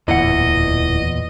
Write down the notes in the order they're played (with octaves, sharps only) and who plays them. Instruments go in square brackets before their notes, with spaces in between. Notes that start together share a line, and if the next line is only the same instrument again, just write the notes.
[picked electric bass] D1 E3 [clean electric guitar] E2 A#2 F#5 [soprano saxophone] D#5